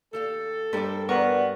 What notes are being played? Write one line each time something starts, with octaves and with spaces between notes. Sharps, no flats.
D#2 G4 A4 F5
G2 A#4 C5 D5
G3 B3 A#4 C#6